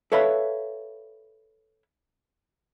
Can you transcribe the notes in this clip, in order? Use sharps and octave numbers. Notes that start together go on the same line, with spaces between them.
A4 B4 C#5 E5 F5 B5